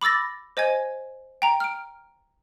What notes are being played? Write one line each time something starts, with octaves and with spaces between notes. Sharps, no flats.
B5 D6 E6 A6 A#6
C5 D#5 G#5 G#6
G5 A#5
F6 D7